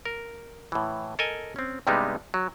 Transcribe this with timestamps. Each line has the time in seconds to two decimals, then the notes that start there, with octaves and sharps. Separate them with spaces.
0.05 A#4
0.72 A2 E3
1.19 A4 A#4 D#5 G#5
1.56 C4 C#4
1.87 G2 C3 G3 G#3 B3 D#4
2.34 F#3